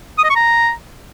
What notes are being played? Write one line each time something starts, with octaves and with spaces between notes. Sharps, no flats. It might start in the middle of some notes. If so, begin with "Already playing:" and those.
D#6
D#5
C#6
A#5